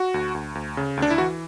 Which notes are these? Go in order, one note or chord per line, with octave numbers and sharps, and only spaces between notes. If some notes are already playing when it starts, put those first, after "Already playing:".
Already playing: F#4
D2
D2
D2
C#3
D2
D4
E4
E3 F#4